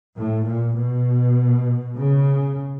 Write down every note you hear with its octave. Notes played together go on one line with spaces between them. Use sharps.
A2
A#2
B2
C#3